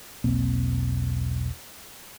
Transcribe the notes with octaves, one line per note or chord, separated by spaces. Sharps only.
E1 B1 A#3 C4